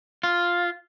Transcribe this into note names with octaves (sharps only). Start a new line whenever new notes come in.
F4